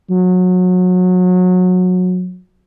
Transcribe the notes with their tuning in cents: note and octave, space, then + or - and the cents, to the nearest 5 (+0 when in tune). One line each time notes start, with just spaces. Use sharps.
F#3 -25